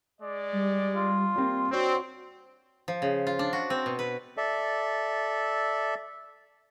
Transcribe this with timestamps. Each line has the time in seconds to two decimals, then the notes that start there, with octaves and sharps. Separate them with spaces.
0.22 G#3 D5
0.53 G3
0.96 F4
1.36 G3 A#3 C4 C6
1.72 C4 D4 F#4 C#5
2.88 F3
3.02 C#3
3.27 F4
3.39 D4
3.53 F#4
3.70 C4
3.86 B2
3.99 B4
4.37 A4 D5 E5